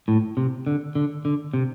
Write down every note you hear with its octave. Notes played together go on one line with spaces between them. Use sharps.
A2
C3
D3
D3
D3
C3